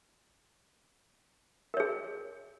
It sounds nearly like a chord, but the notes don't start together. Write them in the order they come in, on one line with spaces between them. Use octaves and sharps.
A#4 C#5 G#4